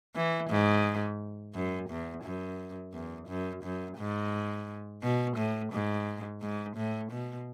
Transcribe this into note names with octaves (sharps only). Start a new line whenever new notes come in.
E3
G#2
F#2
E2
F#2
E2
F#2
F#2
G#2
B2
A2
G#2
G#2
A2
B2